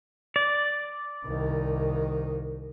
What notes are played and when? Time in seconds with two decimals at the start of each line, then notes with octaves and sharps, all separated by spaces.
0.36 D5
1.25 C2 D#3